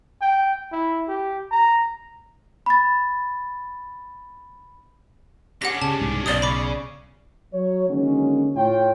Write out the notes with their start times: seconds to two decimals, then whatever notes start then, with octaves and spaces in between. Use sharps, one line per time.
0.21 G5
0.72 E4
1.08 G4
1.51 A#5
2.66 B5 A6
5.62 C#4 D4 G4 F#5 A#6
5.82 C#3 A5
6.00 C2 G#2
6.26 B1 D5 D#6 G7
6.42 C#3 B5 D6
7.53 F#3 C#5
7.89 D3 D#3 F#3 G#3 A#3 C#4
8.56 A2 F4 C#5 G5